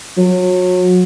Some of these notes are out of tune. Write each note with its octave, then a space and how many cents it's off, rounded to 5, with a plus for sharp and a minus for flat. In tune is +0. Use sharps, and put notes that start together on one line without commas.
F#3 -30